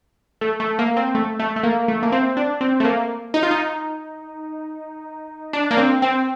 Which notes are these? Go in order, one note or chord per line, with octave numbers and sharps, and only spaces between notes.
A3
A3
A#3
C4
A3
A3
A3
A#3
A3
A#3
C4
D4
C4
A3
A#3
D#4
F4
D#4
D4
A#3
C4
C4